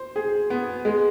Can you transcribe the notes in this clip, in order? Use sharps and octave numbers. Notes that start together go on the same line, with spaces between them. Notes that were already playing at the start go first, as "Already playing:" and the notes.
Already playing: C5
G#4
B3
G#3